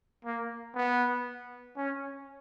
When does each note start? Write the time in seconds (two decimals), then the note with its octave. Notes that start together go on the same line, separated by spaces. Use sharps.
0.25 A#3
0.75 B3
1.76 C#4